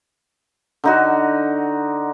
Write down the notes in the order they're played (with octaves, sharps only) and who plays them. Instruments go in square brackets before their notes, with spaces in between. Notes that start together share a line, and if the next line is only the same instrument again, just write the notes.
[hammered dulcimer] D3 D#4 F#4